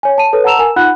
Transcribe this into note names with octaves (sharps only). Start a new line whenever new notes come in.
C#5 G#5
A5 D#7
A4 B4 C#5
F#5 A5 A#5 E6 E7 F7
A#4 G#5
D#4 F4 F#5 B5 F#6